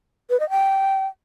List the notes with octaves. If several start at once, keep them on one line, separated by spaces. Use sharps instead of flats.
B4
D#5
G5